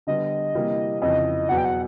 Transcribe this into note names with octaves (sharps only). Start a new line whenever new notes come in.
D3 G3 B3 D#5
C3 E3 G3 A#3
F2 C#3 E3 D#5
E2 B2 F#3 F#5
G5
F#5